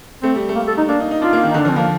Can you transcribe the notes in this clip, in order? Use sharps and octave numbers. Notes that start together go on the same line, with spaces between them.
A3 C4
G3
A3
A#3
A4
D#4
A#3 D4
D#4
D#4
D4 F4
A#3
D#3
D3 D#4
D4
F3
C4
F3 A#3